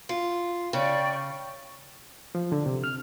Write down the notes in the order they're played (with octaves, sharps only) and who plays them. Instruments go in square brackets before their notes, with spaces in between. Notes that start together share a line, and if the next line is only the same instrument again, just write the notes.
[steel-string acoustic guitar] F4
[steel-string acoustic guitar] C#3 [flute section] D5 G5 C#6
[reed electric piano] F3
D3
C3
F6